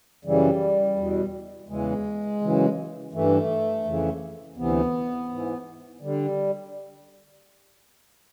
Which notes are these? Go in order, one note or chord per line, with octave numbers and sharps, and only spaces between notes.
F#2 C#3 E3 G3
E2 B2
E2 C#3 E3 G#3
F#2 C#3 E3
G2 E3 A3
F2 C#3 E3
D2 C3 E3 B3
G#2 E3
D3 G3